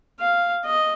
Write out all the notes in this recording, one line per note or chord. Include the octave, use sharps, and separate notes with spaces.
F5
D#5